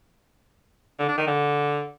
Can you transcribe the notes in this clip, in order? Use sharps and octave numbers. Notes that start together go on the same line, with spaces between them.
D3
D4
D#3
D3